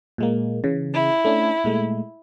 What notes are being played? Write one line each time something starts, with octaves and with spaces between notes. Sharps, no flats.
A#2 G#3 A#3
C#3 E3
E4
A3 C#4 D4
A#2 G#3 A3